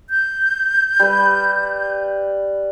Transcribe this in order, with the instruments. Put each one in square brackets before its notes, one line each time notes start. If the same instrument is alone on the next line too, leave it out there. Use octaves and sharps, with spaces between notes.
[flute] G6
[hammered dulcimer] G3 B4